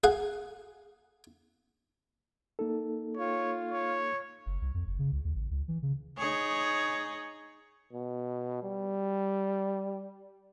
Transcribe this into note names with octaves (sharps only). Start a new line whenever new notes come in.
G#4 F5 F#5
A#3 D#4 A4
F4 C#5
C#5
F#1
C2
F2
F#1
C#3
C#2
D#2
A1
C#2
E3
C#3
D#4 G#4 C#5
B2
G3